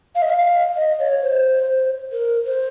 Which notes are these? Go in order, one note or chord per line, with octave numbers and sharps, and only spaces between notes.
F5
D#5
F5
D#5
C#5
C5
A#4
C5